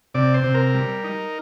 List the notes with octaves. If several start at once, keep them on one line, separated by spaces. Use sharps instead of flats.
C3 D5
C5
C3
A#4
G3
D#4